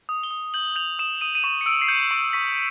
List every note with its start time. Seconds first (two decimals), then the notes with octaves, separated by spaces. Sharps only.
0.09 D#6
0.23 G7
0.31 D#6
0.54 G6 F#7
0.76 G6 F7
0.99 D#6 E7
1.21 D#6 D#7
1.35 D#7
1.44 C#6 E7
1.61 C#7
1.66 E6 D7
1.82 C7
1.88 G6 C#7
2.11 C#6 D7
2.33 C#6 B6